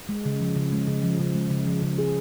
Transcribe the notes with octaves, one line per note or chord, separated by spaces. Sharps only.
G#3
C#3
F3
C#3
G#3
C#3
F3
C#3
G#3
C#3
F3
C#3
G#4